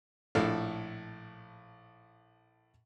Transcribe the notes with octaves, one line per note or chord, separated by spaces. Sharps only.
A#1 A2 A4 F5